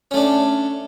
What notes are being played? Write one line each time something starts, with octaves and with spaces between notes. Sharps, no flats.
A3 C#4 D4